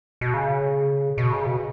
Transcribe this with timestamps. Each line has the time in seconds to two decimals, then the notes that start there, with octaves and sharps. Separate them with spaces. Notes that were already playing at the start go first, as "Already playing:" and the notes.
0.21 B2
0.34 C#3
1.18 B2
1.32 C#3
1.46 B2